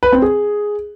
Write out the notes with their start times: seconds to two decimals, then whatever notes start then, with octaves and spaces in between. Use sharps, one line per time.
0.03 B4
0.12 C4
0.22 G#4